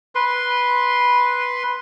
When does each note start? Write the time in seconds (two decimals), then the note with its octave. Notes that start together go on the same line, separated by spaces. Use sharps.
0.15 B4 C6